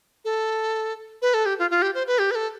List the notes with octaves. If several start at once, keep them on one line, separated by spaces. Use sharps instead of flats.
A4
B4
A4
G4
F4
F4
G4
C5
B4
G4
B4
A4